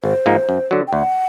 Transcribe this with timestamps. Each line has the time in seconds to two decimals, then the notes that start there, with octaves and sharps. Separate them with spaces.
0.04 G#1 C5
0.26 G#2 F3 A#3 D#4
0.49 F#2
0.71 D3 F#3
0.87 G5
0.93 D2 F#5